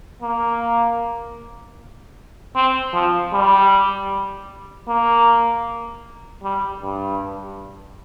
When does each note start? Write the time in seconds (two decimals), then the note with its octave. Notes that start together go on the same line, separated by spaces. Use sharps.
0.22 A#3
2.56 C4
2.94 F3
3.33 G3
4.88 A#3
6.43 G3
6.82 G2